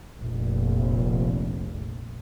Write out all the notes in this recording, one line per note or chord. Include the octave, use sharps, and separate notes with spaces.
F1 A#1